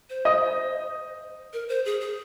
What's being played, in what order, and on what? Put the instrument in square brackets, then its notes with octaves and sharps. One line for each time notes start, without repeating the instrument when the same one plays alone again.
[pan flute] C5
[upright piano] D#5 D#6
[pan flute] A#4
C5
G#4
G#4